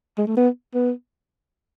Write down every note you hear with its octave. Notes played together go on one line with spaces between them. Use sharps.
G#3
A3
B3
B3